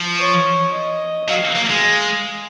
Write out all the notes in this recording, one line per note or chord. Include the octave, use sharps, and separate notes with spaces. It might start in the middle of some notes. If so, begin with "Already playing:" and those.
Already playing: F3
C#5
D#5
F#3 F5
A#3
G#3